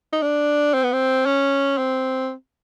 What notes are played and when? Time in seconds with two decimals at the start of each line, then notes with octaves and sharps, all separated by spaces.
0.12 D#4
0.22 D4
0.74 C4
0.83 B3
0.93 C4
1.26 C#4
1.78 C4